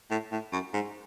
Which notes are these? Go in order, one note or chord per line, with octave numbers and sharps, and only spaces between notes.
A2
A2
F#2
G#2